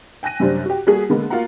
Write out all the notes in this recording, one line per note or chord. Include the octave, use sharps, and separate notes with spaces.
G5 G#5 F#6 A#6 D#7
F#2 C3 G3 C4 D4
F#4 G4
G3 A#3 F#4 G#4 A4
D3 G#3 A#3 B3
A#3 F4 F#4 F5 F#5 A#5